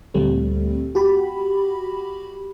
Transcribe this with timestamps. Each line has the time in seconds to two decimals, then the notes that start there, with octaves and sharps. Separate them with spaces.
0.14 D2 A#2 G3 A3 C4
0.95 F#4 G4 B5